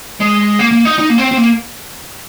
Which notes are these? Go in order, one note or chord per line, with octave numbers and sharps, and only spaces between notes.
G#3
A#3
A#3
D#4
D#4
A#3
C4
C4
A#3